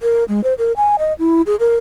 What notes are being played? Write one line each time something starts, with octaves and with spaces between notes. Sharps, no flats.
A#4
G#3
C5
A#4
G#5
D#5
E4
G#4
A#4